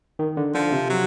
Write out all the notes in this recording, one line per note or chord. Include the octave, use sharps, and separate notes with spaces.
D#3
D3
D3 F3
C3
F#3